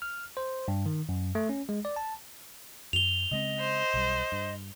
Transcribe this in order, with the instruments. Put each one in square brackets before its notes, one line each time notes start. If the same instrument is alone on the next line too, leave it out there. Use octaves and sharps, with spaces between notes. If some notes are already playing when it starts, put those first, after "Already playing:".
[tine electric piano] F6
C5
G2
D#3
F#2
A3
C#4
G#3
D5
A5
[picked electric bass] F#2 [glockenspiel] F7 G7
[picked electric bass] C#3 G#3 C4 [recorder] D#5
[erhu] C5
[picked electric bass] B1 G3
G2